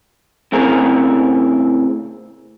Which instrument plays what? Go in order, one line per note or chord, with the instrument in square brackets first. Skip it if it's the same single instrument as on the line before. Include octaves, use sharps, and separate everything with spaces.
[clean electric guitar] A2 C#3 C4 G#4 A#4